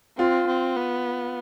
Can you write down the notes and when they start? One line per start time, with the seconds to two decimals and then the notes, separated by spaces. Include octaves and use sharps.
0.18 C4 F4
0.47 C4
0.76 B3